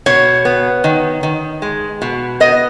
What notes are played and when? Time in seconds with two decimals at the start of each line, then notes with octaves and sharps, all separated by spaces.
0.06 B2 C#5
0.45 B3
0.84 D#3
1.23 D#3
1.62 G#3
2.02 B2
2.40 B3 D#5